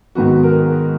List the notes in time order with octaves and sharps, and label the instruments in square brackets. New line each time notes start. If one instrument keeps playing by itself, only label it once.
[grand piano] G#2 D#3 F#3 B3 F#4
A#4
G#4